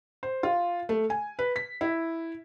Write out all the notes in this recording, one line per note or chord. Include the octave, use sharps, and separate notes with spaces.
C5
F4
A3
G#5
B4
B6
E4